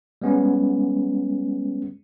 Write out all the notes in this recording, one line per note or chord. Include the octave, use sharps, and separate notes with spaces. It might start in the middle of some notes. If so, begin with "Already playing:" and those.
G3 G#3 B3 C#4